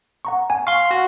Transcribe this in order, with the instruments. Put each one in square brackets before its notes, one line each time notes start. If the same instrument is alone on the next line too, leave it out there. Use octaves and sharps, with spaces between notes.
[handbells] F#5 A#5 C#6
G#5
[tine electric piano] F5 C6 [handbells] C#6
[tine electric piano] F#4